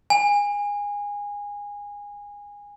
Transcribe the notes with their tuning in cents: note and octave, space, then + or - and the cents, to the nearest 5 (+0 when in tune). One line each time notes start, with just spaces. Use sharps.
G#5 -20